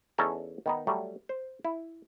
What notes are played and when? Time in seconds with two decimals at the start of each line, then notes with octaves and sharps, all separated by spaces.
0.18 E2 C#4 D#4 A4 G#5 A#5
0.66 D#3 B3 D#4
0.87 F#3 G3 A3
1.29 C5
1.65 E4